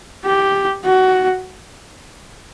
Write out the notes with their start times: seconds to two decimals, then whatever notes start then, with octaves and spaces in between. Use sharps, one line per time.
0.25 G4
0.85 F#4